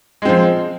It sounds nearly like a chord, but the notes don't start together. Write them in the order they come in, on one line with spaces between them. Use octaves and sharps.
G#3 C4 F3